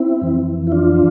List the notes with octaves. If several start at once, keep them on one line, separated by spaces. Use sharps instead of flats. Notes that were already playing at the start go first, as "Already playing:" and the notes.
Already playing: C4 E4
F2 E3
E4
D4 F4